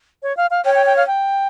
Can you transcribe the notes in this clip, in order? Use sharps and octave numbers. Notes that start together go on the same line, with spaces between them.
C#5
F5
F5
C#5 G5
G5
G5
F5
G5